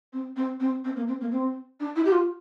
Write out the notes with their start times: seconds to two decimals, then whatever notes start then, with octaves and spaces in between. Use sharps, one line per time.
0.13 C4
0.36 C4
0.60 C4
0.84 C4
0.96 A#3
1.08 C4
1.21 A#3
1.32 C4
1.80 D4
1.96 E4
2.05 G4
2.12 F4